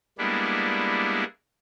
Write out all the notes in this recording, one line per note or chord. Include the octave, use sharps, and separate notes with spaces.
G3 G#3 A#3 B3 D4 E4